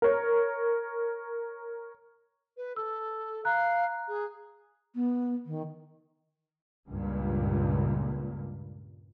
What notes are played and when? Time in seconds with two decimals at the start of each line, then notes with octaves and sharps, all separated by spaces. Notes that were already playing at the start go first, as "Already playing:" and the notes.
0.02 A#4 C#5
2.57 B4
2.76 A4 E6
3.45 F5 A#5 F#6
4.08 G#4
4.95 B3
5.46 D#3
6.87 C#2 G2 A#2